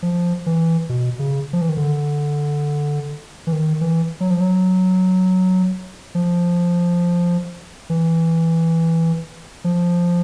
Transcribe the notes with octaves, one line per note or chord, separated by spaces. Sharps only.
F3
E3
B2
C#3
F3
E3
D#3
D3
E3
D#3
E3
F#3
F3
F#3
F3
E3
F3